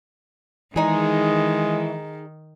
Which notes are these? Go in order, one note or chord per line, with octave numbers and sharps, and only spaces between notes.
D#3 E3 G#3 D#4 G#4